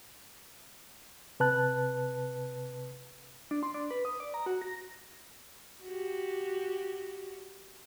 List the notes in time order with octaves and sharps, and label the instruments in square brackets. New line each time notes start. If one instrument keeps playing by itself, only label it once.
[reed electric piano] C3 B4 A5 F#6
[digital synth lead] D4
C6
D4
B4
D#6
D5
A#5
F#4
A#6
[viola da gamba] F#4 G4